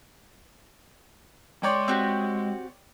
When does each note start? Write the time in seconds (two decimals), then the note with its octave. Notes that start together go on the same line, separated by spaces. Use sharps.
1.63 G#3 C#5 D5 G5 C6
1.88 C4 F#4 G4